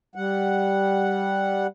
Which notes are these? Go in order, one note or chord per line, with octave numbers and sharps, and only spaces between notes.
G3 F#5